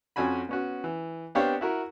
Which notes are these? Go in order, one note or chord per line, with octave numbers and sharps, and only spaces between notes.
F2 C#4 F#4 G#5 B5
B3 C#4 F#4
E3
B3 C4 D4 G4 C#5 F5
E4 F#4 A#4